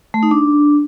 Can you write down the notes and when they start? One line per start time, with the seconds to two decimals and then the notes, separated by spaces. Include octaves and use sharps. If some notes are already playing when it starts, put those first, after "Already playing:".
0.14 A3
0.23 D#4
0.31 D4